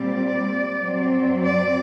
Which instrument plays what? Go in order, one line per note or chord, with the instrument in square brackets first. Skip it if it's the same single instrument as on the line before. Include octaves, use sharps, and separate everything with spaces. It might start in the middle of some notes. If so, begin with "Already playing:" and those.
Already playing: [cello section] A#2 G3 C4 D5
F#2 F#3 C4
D5